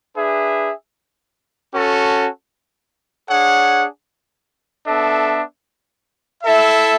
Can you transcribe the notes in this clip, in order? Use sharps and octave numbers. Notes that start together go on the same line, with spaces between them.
D4 G#4 B4 E5
C#4 F#4 A4
D4 G#4 C#5 F#5
B3 D4 A4 E5
E4 A4 E5